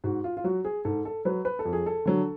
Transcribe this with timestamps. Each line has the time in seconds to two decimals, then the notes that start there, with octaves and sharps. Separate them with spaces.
0.04 G#2 F#4
0.24 F4
0.37 F4
0.44 F#3 F#4
0.65 G#4
0.85 G#2 A4
1.05 A4
1.25 F#3 B4
1.45 B4
1.59 A4
1.65 F2
1.73 G#4
1.86 A4
2.06 D3 F#3